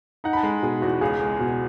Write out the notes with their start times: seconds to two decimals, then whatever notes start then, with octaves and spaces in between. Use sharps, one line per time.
0.24 D#4 F#5
0.33 B5
0.37 A5
0.43 G#3
0.62 B2 G#4
0.82 E2 F#4
1.01 C#2 G#4
1.20 G#3
1.39 B2